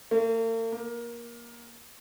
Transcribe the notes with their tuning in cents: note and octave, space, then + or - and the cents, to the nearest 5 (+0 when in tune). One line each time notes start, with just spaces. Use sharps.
A#3 -45
A#3 +20